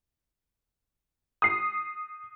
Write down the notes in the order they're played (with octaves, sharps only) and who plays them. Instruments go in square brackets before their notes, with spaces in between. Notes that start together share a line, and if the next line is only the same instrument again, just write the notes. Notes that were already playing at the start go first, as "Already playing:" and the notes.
[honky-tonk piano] D#6 C7